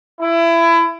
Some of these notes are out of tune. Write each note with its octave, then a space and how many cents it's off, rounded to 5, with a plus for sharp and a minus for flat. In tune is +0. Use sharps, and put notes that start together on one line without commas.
E4 +25